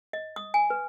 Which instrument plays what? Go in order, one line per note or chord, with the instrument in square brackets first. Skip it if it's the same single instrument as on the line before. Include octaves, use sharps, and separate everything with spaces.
[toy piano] D#5
D#6
G#5
B4